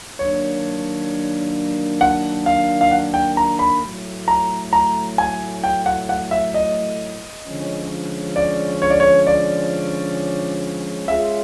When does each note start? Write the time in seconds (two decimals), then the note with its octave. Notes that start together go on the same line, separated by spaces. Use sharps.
0.19 D#3 F#3 A#3 D4 C#5
2.01 F#5
2.46 F5
2.81 F5
2.91 F#5
3.14 G5
3.37 A#5
3.59 B5
3.82 A2 F#3 A3
4.28 A#5
4.73 A#5
5.18 G#5
5.64 G5
5.86 F#5
6.09 F#5
6.31 E5
6.54 D#5
7.45 D3 F3 G#3 C#4
8.36 D5
8.82 C#5
8.90 D5
9.00 C#5
9.27 D5
11.08 G#3 C#4 F4 G#4 E5